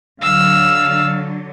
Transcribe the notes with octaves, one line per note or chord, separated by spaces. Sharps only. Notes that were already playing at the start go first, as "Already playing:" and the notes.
D3 F#3 F5 E6